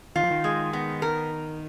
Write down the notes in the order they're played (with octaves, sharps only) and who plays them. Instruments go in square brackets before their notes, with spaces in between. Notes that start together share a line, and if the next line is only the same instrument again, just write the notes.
[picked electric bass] D#3 [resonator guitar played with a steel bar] F4
[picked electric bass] F3
D#3
[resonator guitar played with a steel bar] G#3
B3
A#4